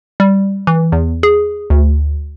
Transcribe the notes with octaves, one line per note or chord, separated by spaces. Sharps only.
G3
E3
E2
G#4
D2